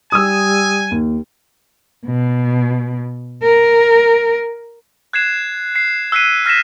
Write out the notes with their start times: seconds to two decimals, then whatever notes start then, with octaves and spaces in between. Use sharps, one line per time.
0.12 G3 G#5 D#6 E6
0.91 D#2
2.06 B2
3.43 A#4
5.13 F#6 G#6 C7 E7
5.76 C7
6.12 E6 F#6 B6 C7 D#7
6.46 F6 A#6 B6 E7